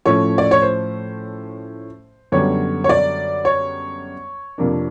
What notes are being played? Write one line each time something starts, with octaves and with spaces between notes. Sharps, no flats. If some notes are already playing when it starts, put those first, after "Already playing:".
A2 F3 A3 C#4 C#5
D5
C#5
C5
F#2 D3 G3 B3 C#5
C#5
D5
C#5
F2 C3 F3 A#3 D4